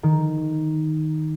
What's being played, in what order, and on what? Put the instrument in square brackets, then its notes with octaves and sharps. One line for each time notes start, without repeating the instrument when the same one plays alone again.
[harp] D#3